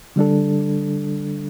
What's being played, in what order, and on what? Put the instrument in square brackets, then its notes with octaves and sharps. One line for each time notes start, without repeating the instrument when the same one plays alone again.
[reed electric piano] D3 G3 D4 A4